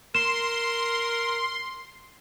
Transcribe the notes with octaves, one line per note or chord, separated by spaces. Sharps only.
A#4 C6 E7